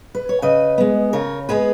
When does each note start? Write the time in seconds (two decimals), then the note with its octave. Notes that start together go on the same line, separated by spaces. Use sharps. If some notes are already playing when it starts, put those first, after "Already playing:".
0.15 B4
0.29 C#5
0.42 C#3 B4 D#5
0.78 G#3 B3
1.13 C#3 A#4 C#5
1.49 G#3 B3 G#4 B4